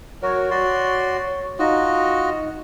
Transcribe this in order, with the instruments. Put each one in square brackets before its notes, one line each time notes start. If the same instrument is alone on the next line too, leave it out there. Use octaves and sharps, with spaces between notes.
[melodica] F#3 F#4 A#4 [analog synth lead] C#5
[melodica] F#4 D5 C6
[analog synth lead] D#4 [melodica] F4 F#4 D#5